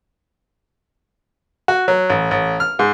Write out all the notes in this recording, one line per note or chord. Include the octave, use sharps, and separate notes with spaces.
F#4
F#3
A1
A1
F6
G#2